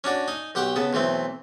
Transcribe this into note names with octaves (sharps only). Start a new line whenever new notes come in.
C#4 D4 F#4 D5
D#4 G#5
B1 G4 F#5 G5 C#6
C#3 B3 A5
B1 E3 A3 C4